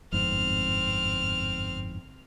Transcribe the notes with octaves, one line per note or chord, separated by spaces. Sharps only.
G1 F2 G#2 C4 F6